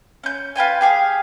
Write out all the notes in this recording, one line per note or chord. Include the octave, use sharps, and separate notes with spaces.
C#4 G6
F4 B4 G5 G#5
G4 G#4 F5